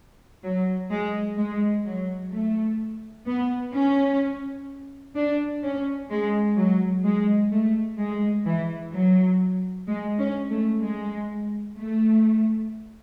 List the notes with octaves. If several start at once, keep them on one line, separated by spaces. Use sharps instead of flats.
F#3
G#3
G#3
F#3
A3
B3
C#4
D4
C#4
G#3
F#3
G#3
A3
G#3
E3
F#3
G#3
C#4
A3
G#3
A3